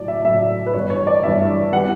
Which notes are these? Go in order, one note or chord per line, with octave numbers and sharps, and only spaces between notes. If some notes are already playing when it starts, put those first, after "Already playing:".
Already playing: A2 F#3 A3 D5
E5
A2 F#3 A3 E5
B4
G2 E3 B3 C#5
C#5
D5
G2 E3 B3 E5
E3 G3 B3 F#5